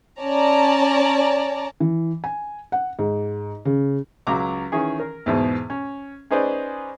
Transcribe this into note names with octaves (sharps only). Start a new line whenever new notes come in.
C#4 D5 A5 A#5
E3
G#5
F#5
G#2
C#3
C#2 F#3 A#5 D6
D#3 E3 C#4 G#4
A#4
E2 G#2 B2
C#4
C#4 D#4 G#4 B4 C5 D5